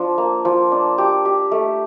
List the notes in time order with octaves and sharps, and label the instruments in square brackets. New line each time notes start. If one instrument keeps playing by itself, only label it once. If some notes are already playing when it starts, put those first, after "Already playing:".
Already playing: [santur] F3 D4
A#3
F3
D4
G4
G4
A3